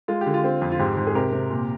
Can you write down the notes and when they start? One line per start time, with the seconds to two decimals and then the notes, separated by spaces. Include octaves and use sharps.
0.08 G#3 F4
0.21 G4
0.26 D3
0.34 F4
0.44 C4
0.62 F2
0.72 F4
0.79 G#2 G4
0.97 G#2
1.07 G#4
1.15 C3 G4 A#4
1.33 C3
1.50 A#2